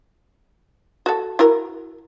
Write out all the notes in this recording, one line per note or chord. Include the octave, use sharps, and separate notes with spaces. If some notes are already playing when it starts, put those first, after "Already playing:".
F#4 A4
E4 F#4 A#4